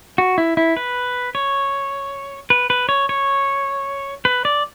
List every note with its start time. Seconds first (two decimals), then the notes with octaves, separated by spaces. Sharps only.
0.18 F#4
0.38 E4
0.57 E4
0.77 B4
1.35 C#5
2.50 B4
2.70 B4
2.89 C#5
3.09 C#5
4.25 B4
4.45 D5